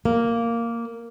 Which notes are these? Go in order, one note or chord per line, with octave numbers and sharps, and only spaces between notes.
A#3